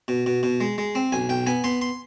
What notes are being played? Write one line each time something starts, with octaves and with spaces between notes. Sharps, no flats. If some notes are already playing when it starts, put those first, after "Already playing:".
B2
B2
B2
G#3
G#3
C4
B1 G#5
B1 G5
B3 G#5
B3 C6
C6